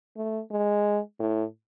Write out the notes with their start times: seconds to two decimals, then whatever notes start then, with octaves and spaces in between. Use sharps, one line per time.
0.17 A3
0.51 G#3
1.20 A2